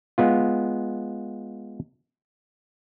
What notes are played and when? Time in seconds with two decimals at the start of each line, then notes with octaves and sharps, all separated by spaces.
0.18 G#3 B3 F4